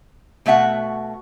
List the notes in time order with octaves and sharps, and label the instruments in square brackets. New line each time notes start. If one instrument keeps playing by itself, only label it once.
[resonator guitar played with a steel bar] B2 A3 F#4 E5 F#5